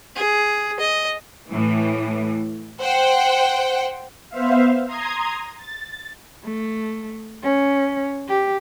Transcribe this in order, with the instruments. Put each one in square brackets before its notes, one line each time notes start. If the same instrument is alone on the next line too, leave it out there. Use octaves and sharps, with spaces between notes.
[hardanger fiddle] G#4
D#5
[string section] A2 E3
C5 F#5 G5
[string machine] B3 C5 E5 F5
A#5 C6 D#6 G#6
A6
[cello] A3
C#4
G4